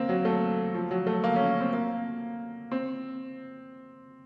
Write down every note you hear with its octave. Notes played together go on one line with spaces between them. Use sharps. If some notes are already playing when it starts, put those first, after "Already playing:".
Already playing: A#3 C4
F#3
A3
F3
F#3
A3
A#3
C#4
C4
A#3
C4